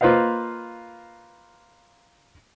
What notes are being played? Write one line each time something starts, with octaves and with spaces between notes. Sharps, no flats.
A#3 F4 B4 C5 D#5 F5